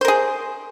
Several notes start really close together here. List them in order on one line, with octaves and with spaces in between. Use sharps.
C5 A#4 G#4